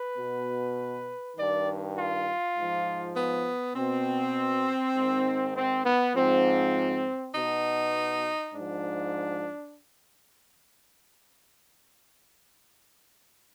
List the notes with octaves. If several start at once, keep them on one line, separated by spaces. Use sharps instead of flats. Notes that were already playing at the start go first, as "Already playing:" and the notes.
Already playing: B4
B2
G2 D#3 D5
F4
G#2
F3
B3
B2 C4
G#2 D#3
C4
B3
G#2 F3 C4
B2 D#4
G#2 F3 D4